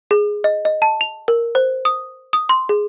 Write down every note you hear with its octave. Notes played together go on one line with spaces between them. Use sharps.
G#4
D#5
D#5
A5
F7
A#4
C5
D#6
D#6
C6
G#4